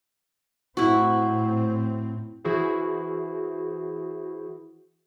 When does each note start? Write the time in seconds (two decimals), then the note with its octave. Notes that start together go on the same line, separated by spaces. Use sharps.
0.77 A2 C4 E4 F#4
2.45 E3 E4 F#4 G#4 C5